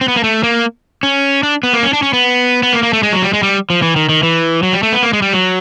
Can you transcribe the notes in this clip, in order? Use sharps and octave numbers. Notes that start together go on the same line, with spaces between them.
C4
B3
A#3
A3
A#3
C#4
D4
B3
A#3
C#4
D4
C#4
B3
B3
A#3
A#3
A3
G#3
F#3
G3
G#3
G3
F3
E3
D#3
D#3
E3
F#3
G3
A3
B3
A#3
G#3
G3
F#3